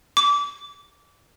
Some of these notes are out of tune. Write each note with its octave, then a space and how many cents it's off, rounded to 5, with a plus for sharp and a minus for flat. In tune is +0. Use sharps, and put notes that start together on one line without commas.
D6 -25